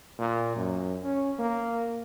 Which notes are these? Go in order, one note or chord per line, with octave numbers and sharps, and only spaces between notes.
A#2
F#2
C#4
A#3